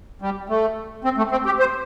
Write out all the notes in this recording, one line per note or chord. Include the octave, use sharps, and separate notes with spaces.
G3
A3
C4
A3
C4
G4
C5